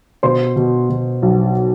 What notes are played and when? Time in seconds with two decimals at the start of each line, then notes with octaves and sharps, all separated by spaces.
0.23 B2 C5 C6
0.56 B2
0.90 B2
1.22 B1